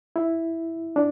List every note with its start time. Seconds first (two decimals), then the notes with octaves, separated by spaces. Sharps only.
0.16 E4
0.96 D4